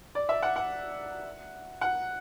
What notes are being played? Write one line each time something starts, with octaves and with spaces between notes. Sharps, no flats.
D5
E5
F#5
F#5
F#5